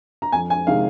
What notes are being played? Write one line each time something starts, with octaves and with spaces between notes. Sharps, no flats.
A#5
F2 G#5
G#5
C3 D#3 G#3 F5